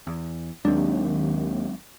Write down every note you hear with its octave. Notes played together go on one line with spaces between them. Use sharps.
E2
D#2 F#3 G#3 C4 D4